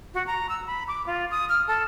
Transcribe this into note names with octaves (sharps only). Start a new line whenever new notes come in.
F#4
A#5
E6
B5
D6
F4
D#6
F6
A4